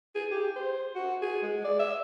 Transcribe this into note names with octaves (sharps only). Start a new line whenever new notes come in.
G#4
G4
C5
F#4
G#4
G#3
D5
E5